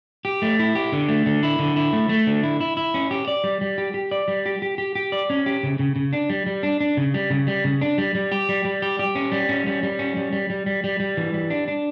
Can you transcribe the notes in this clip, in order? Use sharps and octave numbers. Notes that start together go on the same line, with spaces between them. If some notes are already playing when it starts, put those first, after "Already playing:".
G4
A3
E4
G4
D3
A3
D3
E4
D3
E4
A3
A3
D3
E4
E4
E4
C#4
G4
D5
G3
G3
G4
G4
D5
G3
G4
G4
G4
G4
D5
C#4
G4
C#3
C#3
C#3
D4
G3
G3
D4
D4
C#3
G3
C#3
G3
C#3
D4
G3
G3
G4
G3
G3
G4
G4
C#4
G3
C#4
G3
G3
C#4
G3
G3
G3
G3
G3
G3
E3
G3
D4
D4